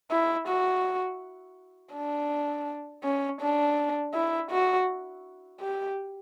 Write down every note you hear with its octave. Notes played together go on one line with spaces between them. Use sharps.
E4
F#4
D4
C#4
D4
E4
F#4
G4